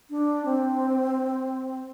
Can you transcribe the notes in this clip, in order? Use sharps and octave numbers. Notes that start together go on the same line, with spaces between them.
D4
C4